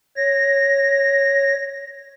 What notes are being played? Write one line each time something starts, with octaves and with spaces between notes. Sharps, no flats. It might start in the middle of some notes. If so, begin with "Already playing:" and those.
C#5 A#6